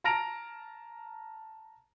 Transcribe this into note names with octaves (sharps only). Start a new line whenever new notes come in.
A5 A#5 F6 A#6 D7 F7